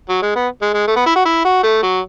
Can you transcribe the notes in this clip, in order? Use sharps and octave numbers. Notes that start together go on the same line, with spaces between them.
F#3
G#3
B3
G#3
G#3
A3
B3
E4
F#4
E4
F#4
A3
F#3